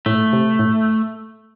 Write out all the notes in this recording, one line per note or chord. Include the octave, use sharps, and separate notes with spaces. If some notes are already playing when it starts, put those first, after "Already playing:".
A2 A3
C3
A2